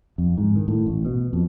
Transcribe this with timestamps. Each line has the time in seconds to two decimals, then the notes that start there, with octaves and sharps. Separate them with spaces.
0.18 F2
0.38 G#2
0.56 D#3
0.68 A2
0.86 A1
1.05 B2
1.33 F2